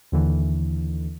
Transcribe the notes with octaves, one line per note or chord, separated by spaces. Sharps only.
D#2 D3 E3